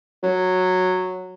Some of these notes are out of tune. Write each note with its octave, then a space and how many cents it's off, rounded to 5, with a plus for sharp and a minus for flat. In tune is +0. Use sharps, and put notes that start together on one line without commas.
F#3 -5